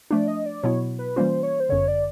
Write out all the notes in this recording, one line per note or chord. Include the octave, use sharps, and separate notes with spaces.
F3 A3 D4 D5
D#5
D5
B2 F#3 B3 E4 C#5
B4
E3 G3 A#3 C#4 F4 C5
C#5
C5
G1 F#2 D3 C#5
D5